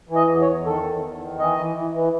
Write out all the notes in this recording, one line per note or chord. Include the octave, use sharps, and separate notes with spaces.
E3
D#5
E2
C#5
E2
D#3 A4
E2
E2
D#3
E3 D#5
E3
E3
E3